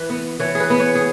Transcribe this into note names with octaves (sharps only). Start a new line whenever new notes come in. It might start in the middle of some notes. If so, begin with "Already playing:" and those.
Already playing: E3 B4
B3
E3 C#5
G#4 B4
B3
C#5
G#4